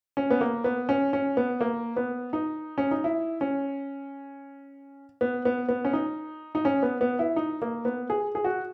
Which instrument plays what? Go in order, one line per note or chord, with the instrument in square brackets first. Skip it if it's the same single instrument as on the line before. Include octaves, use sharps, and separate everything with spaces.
[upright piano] C#4
B3
A#3
B3
C#4
C#4
B3
A#3
B3
D#4
C#4
D#4
E4
C#4
B3
B3
B3
C#4
D#4
D#4
C#4
B3
B3
E4
D#4
A#3
B3
G#4
G#4
F#4